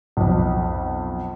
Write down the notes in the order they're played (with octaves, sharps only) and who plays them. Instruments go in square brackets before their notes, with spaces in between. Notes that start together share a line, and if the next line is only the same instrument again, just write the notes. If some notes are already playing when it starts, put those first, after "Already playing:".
[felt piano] B1 F2